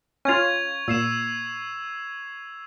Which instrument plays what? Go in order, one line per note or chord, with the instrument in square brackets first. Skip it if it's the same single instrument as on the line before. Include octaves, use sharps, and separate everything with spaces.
[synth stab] C#4 F4 [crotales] C#6 G#6 F7
[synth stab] A#2 [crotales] E6 C7 E7